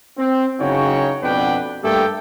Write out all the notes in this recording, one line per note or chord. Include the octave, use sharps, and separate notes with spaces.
C4
F#1 C#3 D#4 F#4 C#5 G5
F2 B2 B3 D4 B4 G5
G2 A3 A#3 G4 A4 G5